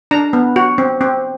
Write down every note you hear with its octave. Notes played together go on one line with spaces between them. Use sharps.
D4 A#5
B3
F#4
C4
C4